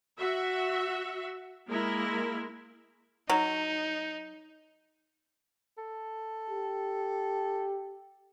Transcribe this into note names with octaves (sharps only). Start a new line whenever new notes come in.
F#4 E5
G#3 A#3 E4 A#4
F#3 D#4
A4
G4